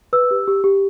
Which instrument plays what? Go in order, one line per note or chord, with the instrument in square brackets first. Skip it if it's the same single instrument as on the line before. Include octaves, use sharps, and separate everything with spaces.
[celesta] B4 E6
G4
G4
G4